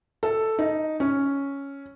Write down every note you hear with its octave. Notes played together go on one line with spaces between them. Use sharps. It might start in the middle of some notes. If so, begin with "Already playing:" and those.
A4
D#4
C#4